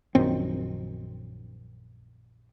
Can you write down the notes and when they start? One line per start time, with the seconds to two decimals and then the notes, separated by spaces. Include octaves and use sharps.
0.15 A#1 F#2 D#3 C4